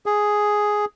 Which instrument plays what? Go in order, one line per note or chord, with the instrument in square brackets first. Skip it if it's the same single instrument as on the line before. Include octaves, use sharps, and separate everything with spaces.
[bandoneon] G#4